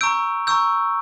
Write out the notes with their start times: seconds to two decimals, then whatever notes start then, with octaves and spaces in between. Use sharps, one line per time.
0.01 A#5 C#6 E6 G6 D7
0.47 A#5 C#6 E6 G6